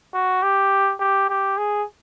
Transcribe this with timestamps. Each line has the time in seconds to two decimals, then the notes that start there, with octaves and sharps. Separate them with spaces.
0.14 F#4
0.43 G4
1.00 G4
1.29 G4
1.58 G#4